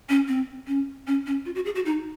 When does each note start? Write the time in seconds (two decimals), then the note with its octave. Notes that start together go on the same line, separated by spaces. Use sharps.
0.09 C#4
0.28 C4
0.67 C#4
1.07 C#4
1.27 C#4
1.46 F4
1.55 F#4
1.65 G#4
1.75 F#4
1.86 D#4